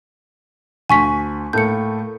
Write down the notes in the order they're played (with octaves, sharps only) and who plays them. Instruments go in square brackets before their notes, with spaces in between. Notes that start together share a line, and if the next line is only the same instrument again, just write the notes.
[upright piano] D2 [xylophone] G#5 C#6 B6
[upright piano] A2 A3 A#3 [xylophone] G6 C#7